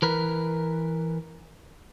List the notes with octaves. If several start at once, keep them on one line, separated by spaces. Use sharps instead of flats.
E3 A#4 B4